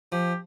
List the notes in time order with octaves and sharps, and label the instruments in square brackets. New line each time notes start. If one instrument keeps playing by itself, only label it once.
[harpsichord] F3 [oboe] G4